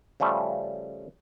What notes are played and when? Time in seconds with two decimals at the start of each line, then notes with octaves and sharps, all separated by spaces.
0.20 C#3 F3 G3 A3